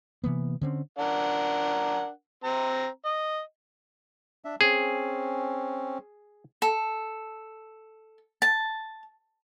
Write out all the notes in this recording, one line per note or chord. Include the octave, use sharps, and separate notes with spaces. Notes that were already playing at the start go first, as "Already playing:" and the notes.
C3 E3 A#3 B3
D3 C4 C#4
D4 A#4 F#5
C4 A#5
D#5
D4 E5
C4 C#4 G#4
A4
A5